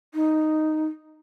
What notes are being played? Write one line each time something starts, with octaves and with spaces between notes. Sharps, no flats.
D#4